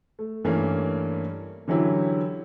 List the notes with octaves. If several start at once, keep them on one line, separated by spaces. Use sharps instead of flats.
A3
G2 E3 A3 A#3 C#4
D3 E3 F#3 C#4 E4 G4